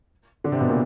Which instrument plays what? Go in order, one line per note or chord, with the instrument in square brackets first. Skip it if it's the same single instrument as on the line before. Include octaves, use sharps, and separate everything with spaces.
[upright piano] D3 D4
C3 C4
B2 B3
A#2 A#3